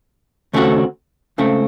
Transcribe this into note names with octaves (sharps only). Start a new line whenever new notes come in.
D#2 C#3 A3 C4 F#4
C#2 C#3 A3 C4